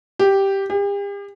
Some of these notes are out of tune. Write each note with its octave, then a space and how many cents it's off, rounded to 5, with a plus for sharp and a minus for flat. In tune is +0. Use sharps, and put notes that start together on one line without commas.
G4 -5
G4 +40